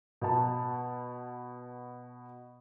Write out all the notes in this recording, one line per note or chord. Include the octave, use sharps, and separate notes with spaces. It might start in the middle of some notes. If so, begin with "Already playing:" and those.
B2 A5